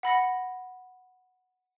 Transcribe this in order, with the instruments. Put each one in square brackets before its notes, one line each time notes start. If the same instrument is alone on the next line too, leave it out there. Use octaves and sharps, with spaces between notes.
[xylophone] F#5 B5 A#6 C#7